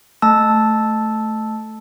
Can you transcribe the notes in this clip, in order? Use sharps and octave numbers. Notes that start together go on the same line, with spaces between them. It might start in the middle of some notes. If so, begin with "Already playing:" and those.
A3 A5 E6